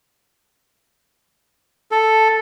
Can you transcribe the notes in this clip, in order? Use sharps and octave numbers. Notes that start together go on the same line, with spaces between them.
A4